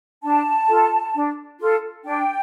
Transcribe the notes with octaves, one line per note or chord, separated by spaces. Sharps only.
D4 A5
F4 A4
D4
F4 A4
D4 G5